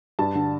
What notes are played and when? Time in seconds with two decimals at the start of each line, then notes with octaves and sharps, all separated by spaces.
0.19 G2 A5
0.35 D3